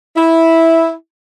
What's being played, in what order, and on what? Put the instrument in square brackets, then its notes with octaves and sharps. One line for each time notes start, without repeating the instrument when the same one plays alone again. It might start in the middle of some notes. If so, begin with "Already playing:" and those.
[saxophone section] E4